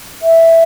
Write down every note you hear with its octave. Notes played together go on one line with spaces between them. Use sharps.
E5